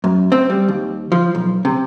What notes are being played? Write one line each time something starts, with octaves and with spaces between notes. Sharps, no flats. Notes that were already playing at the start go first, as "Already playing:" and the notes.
F#2
C4
G3
D#2
F3
B1
C3